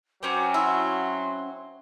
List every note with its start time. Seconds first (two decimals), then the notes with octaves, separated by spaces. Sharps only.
0.23 F#3 C4 C#4 F#4 D6
0.54 E4 C6